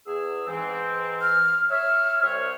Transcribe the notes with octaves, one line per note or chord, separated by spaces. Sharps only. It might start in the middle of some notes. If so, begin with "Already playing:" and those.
E2 G#4 E6
G#2 E3 C4
F6
C#5 E5 F6
C2 C5 C#5